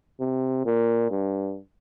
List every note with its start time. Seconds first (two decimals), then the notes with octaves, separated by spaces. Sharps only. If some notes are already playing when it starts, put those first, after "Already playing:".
0.20 C3
0.65 A#2
1.11 G2